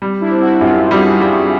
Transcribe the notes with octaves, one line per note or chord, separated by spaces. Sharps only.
G3
D4 E4
C4
E4 F#4
F#2 F4 G4
G3 F#4 G#4
G3